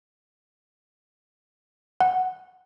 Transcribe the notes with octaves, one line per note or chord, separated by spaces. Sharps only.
F#5